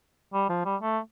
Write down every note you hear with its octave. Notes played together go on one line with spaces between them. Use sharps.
G3
F3
G3
A3